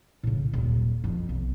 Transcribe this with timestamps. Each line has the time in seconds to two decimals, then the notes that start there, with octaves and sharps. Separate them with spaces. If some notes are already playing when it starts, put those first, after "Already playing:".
0.23 A2 C#3
0.53 D#1 F#3
1.04 F2
1.29 B1